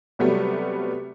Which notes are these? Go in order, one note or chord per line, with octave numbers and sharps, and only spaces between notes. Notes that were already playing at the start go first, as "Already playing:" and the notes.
C3 F#3 G3 A3 B3